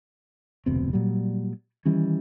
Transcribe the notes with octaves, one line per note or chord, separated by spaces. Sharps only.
F1 D2 B2 C4
A#2 F#3 G3
D#3 E3 G3 C#4